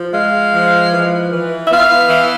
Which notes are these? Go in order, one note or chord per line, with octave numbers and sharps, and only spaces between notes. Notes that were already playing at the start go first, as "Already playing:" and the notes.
Already playing: F3
G#3 F5
F3
E3
E3
E5
B3 F5
E3